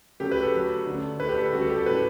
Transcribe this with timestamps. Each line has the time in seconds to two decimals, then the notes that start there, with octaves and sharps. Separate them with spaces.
0.20 C#3 F#3 A3 G4
0.31 B4
0.42 A4
0.53 C#3 F#3 A3
0.86 D3 A3
1.20 D3 A3 B4
1.29 G4
1.37 A4
1.53 C#3 G3 F#4
1.61 A4
1.69 G4
1.78 A4
1.86 A2 F#3 A3 B4